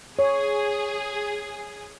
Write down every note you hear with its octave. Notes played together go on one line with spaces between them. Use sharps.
G#4 C#5